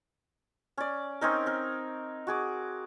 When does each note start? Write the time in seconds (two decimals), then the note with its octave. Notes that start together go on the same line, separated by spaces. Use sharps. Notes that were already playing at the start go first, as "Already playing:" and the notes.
0.77 C#4 D5
1.21 C4 C#4 D#4 A#4
1.46 C4 A#4
2.27 F#4 G#4 D6